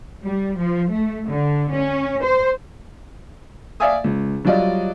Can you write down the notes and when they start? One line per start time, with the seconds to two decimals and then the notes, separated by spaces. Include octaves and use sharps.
0.24 G3
0.57 F3
0.92 A3
1.28 D3
1.72 C#4
2.23 C5
3.80 D5 E5 F5 G#5 D#6
4.04 C#2
4.45 F#3 G3 F4 D5 D#5 F5